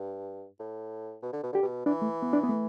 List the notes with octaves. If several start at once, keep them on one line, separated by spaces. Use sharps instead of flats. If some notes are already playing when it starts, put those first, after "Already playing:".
Already playing: G2
A2
B2
D3
B2
D3 G4
B2
E3 D4
A3
B3
D4
B3
A3